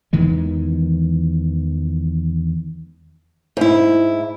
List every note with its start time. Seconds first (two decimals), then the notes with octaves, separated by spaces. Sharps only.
0.13 E2 D#3 E3 G#3
3.57 G#2 E4